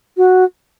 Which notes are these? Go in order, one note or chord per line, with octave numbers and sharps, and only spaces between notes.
F#4